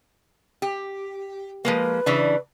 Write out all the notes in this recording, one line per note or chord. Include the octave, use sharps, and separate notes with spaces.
G4
F3 G#3 A#3 B4
C#3 E3 D4